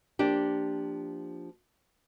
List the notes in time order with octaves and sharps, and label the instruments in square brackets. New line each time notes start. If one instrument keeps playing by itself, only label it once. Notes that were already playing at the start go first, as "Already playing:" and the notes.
[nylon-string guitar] F3 A#3 D4 G4